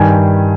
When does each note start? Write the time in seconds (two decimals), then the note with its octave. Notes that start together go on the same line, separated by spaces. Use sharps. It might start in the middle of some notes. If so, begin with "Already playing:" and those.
Already playing: G2 D#3 G3 G#5